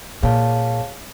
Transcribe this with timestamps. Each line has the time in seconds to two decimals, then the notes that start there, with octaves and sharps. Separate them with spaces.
0.22 A#2 G#4 C#5 F5 A5